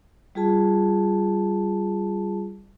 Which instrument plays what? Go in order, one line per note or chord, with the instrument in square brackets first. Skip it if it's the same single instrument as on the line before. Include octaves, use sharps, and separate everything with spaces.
[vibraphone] G3 F4 G#4 A5